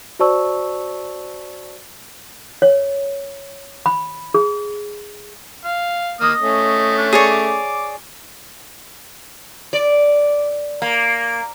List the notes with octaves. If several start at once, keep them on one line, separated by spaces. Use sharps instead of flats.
F#4 C5 D5 A5 C#6 E6
C#5
B5
G#4
F5
A#3 D#5 D#6 F6
A3 C#4
D4
G#4 C#5 D5 C#6
D6
D5
A#3